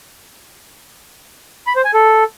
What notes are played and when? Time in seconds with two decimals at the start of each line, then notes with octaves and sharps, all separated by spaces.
1.67 B5
1.76 C5
1.85 G#5
1.94 A4